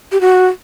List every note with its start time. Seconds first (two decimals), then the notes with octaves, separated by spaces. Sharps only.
0.12 G4
0.21 F#4